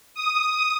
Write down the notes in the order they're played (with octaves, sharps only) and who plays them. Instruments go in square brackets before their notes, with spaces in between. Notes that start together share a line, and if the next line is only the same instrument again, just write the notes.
[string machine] D#6